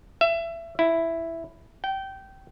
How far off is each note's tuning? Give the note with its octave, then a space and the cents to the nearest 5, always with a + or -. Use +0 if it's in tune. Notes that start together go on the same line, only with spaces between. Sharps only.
E5 +25
E4 +5
G5 -20